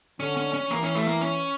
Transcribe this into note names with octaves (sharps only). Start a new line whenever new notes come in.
D3 C#4
C#4
C#4
E3 A#3
C#4
A3
A#3
C#4